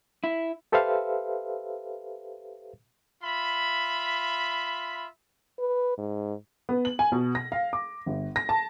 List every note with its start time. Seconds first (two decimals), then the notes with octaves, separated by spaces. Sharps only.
0.24 E4
0.72 G4 A4 B4 C5 E5 F5
3.23 F4 E5 B5
5.59 B4
5.98 G#2
6.69 B3
6.85 F#7
6.99 G#5
7.12 B2
7.35 A#6
7.52 F5
7.73 D6
8.06 G1
8.36 A#6
8.49 A5